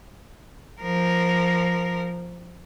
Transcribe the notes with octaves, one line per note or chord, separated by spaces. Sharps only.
F3 A#4